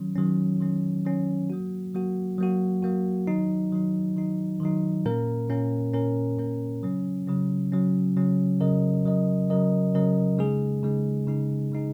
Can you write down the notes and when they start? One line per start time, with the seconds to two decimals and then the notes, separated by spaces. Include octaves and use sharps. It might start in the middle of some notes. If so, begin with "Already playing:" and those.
Already playing: D#3 F#3 C#4
0.16 D#3 F#3 C#4
0.60 D#3 F#3 C#4
1.05 D#3 F#3 C#4
1.50 F#3 A#3 F#4
1.94 F#3 A#3 F#4
2.38 F#3 A#3 F#4
2.83 F#3 A#3 F#4
3.27 D#3 F#3 D#4
3.72 D#3 F#3 D#4
4.16 D#3 F#3 D#4
4.61 D#3 F#3 D#4
5.05 A#2 A#3 C#4 A#4
5.50 A#2 A#3 C#4 A#4
5.94 A#2 A#3 C#4 A#4
6.38 A#2 A#3 C#4 A#4
6.83 C#3 F#3 C#4
7.27 C#3 F#3 C#4
7.72 C#3 F#3 C#4
8.16 C#3 F#3 C#4
8.61 C#3 F#3 C#4 A#4 D#5
9.05 C#3 F#3 C#4 A#4 D#5
9.50 C#3 F#3 C#4 A#4 D#5
9.95 C#3 F#3 C#4 A#4 D#5
10.38 C#3 G#3 D#4 G#4
10.83 C#3 G#3 D#4 G#4
11.27 C#3 G#3 D#4 G#4
11.72 C#3 G#3 D#4 G#4